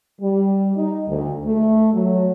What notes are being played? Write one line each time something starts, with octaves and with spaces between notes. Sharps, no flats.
G3
D#4
D2
A3
F#3